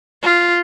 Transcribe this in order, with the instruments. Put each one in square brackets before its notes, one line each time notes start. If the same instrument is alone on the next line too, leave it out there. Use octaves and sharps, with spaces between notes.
[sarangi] F4